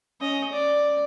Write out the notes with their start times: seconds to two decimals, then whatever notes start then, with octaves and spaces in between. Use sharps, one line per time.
0.21 C#4 D#5
0.52 D5